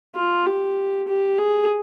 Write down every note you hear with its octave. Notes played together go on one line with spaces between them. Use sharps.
F4
G4
G4
G#4